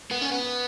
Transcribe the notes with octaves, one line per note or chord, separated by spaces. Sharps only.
B3
C#4
B3